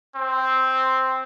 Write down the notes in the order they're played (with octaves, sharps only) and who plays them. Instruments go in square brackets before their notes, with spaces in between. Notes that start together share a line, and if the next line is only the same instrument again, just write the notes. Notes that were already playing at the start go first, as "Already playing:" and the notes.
[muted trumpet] C4